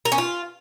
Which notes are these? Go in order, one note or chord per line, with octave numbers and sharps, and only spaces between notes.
A#4
C#4
F4